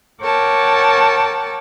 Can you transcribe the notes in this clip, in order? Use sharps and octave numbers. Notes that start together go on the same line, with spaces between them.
A#4 C#5 F#5 G5 A5 D6